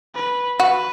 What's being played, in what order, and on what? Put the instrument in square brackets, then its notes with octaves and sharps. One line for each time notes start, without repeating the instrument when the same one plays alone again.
[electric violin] B4
[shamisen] F#4 [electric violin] B4